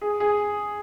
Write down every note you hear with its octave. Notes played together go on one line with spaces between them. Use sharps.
G#4
G#4